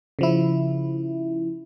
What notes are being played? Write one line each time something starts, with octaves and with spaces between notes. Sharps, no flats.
C#3 F3 E4